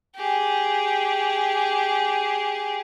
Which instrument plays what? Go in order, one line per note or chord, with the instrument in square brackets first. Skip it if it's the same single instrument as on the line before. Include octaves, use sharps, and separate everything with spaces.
[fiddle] G4 G#4